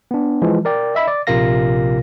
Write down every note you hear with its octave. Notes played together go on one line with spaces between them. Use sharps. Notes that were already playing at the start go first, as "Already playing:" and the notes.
B3 D4
E3 F3 G#3
A#4 D5 G5
D#5 E5 B5
D5
A#1 C3 F4 A#4 F5 A#6